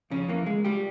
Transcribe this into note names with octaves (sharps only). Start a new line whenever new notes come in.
F2 C#3 C#4
E3 A#3
C#2 G#3
C#2 G3 G4